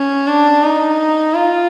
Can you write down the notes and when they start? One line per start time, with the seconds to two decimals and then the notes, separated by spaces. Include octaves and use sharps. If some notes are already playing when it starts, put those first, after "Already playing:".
Already playing: C#4
0.28 D4
0.63 D#4
1.34 F4